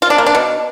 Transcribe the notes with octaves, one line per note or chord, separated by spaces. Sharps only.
F4
D4
A#3
D4
B2